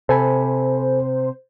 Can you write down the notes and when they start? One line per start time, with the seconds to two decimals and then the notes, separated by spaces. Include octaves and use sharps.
0.09 C3 A4 C5 G#5 B5